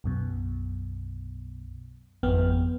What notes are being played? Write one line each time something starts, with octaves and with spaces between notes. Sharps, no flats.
B1 F#2 B2
G#1 F2 B3 G5 F6